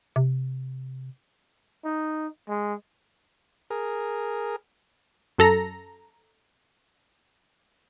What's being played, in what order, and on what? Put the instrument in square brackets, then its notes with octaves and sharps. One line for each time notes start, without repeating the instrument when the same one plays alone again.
[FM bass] C3
[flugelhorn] D#4
G#3
[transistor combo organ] G#4 A#4
[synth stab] F#2 A4 A#5